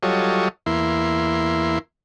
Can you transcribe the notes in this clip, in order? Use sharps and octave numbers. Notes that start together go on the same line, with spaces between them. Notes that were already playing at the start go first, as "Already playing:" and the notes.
F#3 G3 F4 A4 C#5 D#5
E2 A#3 E4 C6